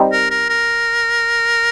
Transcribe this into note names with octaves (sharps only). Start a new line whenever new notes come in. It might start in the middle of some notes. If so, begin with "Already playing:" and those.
Already playing: G3 C4 D#4
A#4
A#4
A#4